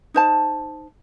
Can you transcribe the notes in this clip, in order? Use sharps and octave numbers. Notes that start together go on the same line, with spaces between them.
D#4 C5 A5